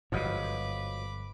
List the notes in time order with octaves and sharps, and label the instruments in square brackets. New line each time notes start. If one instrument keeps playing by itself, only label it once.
[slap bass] G1 G#2 [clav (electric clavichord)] F3 F#3 D#5 [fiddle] B4 D6